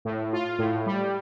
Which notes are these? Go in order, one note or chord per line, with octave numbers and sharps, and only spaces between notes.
A2
F4
A2
G3